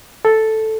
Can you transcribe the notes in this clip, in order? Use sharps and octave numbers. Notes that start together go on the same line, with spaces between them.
A4